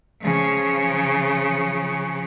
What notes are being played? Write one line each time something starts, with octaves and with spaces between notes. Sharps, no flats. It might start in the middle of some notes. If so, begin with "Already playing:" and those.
C#3 F3